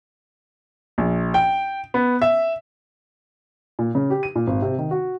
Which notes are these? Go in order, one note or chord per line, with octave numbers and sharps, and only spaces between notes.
A#1
G5
B3
E5
A#2
C#3
G4
D#7
A#2
G#1
C3
D#3
F#4